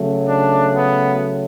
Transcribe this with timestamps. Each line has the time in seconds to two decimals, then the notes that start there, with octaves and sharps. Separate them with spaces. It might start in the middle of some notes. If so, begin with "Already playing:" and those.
Already playing: C#3 F#3 A3
0.27 D4
0.74 B3